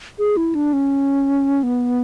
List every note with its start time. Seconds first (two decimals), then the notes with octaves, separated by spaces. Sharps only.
0.19 G#4
0.37 E4
0.55 D4
0.73 C#4
1.63 B3